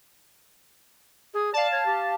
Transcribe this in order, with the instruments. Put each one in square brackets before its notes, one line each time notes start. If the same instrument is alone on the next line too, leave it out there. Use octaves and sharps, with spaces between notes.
[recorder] G#4
[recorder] D5 [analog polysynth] F5 A5
[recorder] C#5
G4